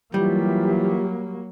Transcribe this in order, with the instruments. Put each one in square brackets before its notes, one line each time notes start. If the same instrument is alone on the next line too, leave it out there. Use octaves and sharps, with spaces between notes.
[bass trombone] E3 [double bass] F#3 A#3 [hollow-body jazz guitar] G3 [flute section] F4 G4 E5